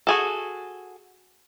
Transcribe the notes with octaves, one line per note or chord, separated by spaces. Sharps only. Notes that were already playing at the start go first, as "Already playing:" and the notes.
F#4 G#4 A4